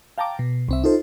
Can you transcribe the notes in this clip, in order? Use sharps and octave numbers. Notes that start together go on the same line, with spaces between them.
F5 G5 A5 A#5 D6
B2
C2 C4 E5
D#4 F4 A4 C5